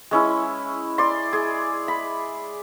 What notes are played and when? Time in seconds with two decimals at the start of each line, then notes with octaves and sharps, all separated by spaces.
0.11 G#3 C#4 E4
0.98 D5 C6
1.33 G#4
1.88 B5